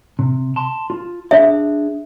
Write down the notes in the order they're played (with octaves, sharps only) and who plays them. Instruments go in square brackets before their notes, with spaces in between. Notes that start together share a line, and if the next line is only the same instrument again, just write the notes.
[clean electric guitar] C3
A5 C6
F4
[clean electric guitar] D4 G#4 [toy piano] E5